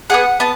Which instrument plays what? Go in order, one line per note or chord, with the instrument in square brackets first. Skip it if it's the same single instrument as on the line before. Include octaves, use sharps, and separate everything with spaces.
[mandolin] B3 D4 G#4 F#5
B3 A5